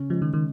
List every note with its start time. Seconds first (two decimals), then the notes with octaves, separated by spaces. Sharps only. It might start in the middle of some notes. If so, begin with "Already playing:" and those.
Already playing: C#3 C#4
0.10 F3 G#3
0.22 D#3
0.34 D#3